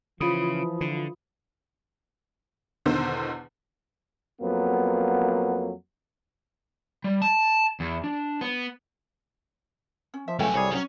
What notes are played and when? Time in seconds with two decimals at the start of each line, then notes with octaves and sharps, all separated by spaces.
0.21 C#3 E3 F3 F4 B5 D#6
0.81 D3
2.86 E2 B2 D3 D#3 B3 C5
4.41 F2 F#3 A#3 B3
7.04 G3
7.22 A5
7.80 E2
8.04 D4
8.41 B3
10.14 C#4
10.28 F3 E5
10.39 C#2 F#3 A3 B3 A4 G5 G#5
10.54 C2 G3 G#4 C#5
10.72 F#3 G3 C#4